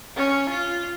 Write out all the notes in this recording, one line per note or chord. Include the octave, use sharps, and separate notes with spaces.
C#4
F4